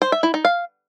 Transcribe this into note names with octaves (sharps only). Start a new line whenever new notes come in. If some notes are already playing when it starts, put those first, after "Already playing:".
C5
E5
E4
D#4
F5